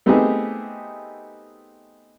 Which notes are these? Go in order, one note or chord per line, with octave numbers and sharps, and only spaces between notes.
A3 B3 C4 D#4 G4 G#4